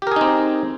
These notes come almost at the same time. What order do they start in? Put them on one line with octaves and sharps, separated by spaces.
G4 A#4 G#4 D#4 C4